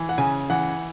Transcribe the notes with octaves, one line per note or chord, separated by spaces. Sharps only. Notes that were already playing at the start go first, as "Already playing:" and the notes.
Already playing: E3
F#5
C#3 G#5
E3 F#5